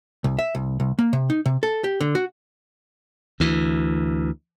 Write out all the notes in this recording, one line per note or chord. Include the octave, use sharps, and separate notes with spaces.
C2
E5
C2
C2
A#3
C3
D#4
C3
A4
G4
D3
F#4
D2 E3